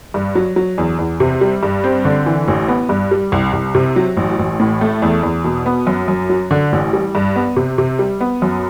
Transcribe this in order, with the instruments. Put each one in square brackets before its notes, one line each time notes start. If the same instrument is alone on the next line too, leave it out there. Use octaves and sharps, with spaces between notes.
[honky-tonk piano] G2
F#3
F#3
E2
E2
C3
G3
G2
C4
D3
E3
A1
B3
G2
G3
C2
C2
C3
F#3
A1
A1
A2
A3
E2
E2
B2
B3
F#2
F#2
F#3
D3
A1
G3
G2
B3
C3
C3
G3
B3
F#2